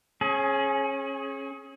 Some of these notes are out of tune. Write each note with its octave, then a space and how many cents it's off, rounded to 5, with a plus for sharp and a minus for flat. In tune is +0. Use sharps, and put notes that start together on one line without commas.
C#4 -25 G#4 +20